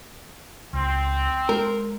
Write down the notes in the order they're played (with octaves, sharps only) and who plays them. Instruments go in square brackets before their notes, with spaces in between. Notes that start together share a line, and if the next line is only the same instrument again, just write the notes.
[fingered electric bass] C#2 [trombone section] C4
[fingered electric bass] G#3 [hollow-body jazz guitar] A#4